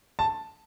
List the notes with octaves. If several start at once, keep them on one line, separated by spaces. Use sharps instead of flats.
A5